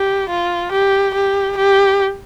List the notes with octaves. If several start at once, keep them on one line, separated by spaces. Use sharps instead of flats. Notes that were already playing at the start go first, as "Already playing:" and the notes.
Already playing: G4
F4
G4
G4
G4